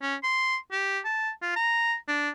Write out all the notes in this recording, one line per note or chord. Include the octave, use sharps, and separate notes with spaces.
C#4
C6
G4
A5
F4
A#5
D4